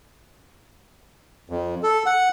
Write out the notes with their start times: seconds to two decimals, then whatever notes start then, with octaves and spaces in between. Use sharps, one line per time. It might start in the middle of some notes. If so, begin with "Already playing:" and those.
1.50 F2
1.83 A4
2.06 F#5